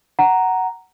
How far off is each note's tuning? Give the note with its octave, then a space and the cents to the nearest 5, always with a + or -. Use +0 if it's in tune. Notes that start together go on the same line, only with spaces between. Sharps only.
F#5 +10 A#5 +0